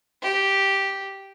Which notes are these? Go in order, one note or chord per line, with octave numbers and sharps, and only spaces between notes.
G4